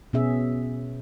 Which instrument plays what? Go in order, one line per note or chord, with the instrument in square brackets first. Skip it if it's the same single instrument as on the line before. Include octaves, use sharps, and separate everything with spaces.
[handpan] B2 B3 C#4 G#4 E5